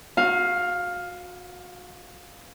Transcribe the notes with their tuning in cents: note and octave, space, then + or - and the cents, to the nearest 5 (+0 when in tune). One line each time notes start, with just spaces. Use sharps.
F#4 -30 F5 +10